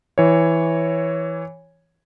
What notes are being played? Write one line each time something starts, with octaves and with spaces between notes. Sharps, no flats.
E3 C#5